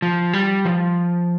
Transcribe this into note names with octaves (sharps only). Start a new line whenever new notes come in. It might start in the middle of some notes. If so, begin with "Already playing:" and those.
F3
G3
F3